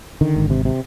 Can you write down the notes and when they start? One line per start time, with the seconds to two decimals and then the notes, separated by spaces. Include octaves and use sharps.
0.21 D3 D#3
0.36 G#1
0.50 C3
0.65 C3